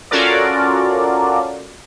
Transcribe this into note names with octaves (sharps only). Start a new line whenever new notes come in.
C#4 F4 F#4 A4 A#4 D5